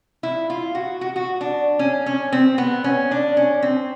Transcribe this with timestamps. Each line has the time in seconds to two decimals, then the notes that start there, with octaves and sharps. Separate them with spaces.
0.23 E4
0.50 F4
0.75 F#4
1.01 F#4
1.16 F#4
1.41 D4
1.79 C#4
2.06 C#4
2.32 C4
2.58 B3
2.84 C#4
3.11 D4
3.37 C#4
3.62 C4